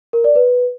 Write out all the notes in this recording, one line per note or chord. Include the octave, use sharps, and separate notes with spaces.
A#4
D5
B4